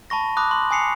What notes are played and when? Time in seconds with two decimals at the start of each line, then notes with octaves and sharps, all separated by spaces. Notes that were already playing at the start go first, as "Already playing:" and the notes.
0.10 A5 B5 C#6 A#6
0.37 A5 B5 D6 D#6 F#6
0.51 C6
0.71 G#5 D#6 C7 C#7 F7